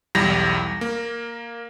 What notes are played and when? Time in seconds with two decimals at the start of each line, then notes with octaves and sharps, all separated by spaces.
0.15 B1 E2 G3 A#6
0.81 A#3